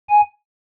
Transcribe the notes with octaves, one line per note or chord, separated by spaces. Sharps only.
G#5